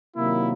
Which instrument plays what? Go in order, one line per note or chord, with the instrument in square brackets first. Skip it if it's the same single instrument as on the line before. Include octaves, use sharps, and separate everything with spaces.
[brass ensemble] C3 D#3 F#3 A#3 E4